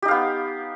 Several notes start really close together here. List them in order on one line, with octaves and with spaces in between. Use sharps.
G4 D#4 F5 B3